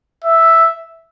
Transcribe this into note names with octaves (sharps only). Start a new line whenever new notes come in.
E5